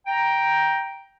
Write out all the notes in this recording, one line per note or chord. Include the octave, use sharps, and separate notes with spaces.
G5 A#5